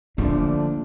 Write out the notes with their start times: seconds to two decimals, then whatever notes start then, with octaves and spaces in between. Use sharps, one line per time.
0.18 D3 F3 A3 A#3 D4